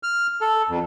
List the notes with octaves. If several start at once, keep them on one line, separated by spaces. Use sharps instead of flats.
F6
A4
F2